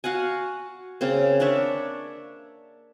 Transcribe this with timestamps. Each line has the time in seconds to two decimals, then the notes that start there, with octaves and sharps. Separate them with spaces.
0.04 F#4 F5 F#5 G#5
1.01 C#3 A#3 C4
1.40 D4 C#5 D5 E5